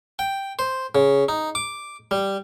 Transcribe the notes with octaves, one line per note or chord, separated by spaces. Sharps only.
G5
C5
C#3
D#4
D6
G3